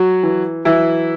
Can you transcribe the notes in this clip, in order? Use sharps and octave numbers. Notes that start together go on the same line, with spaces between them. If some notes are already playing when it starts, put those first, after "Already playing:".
Already playing: F#3 F#4
E3
E3 F#3 E4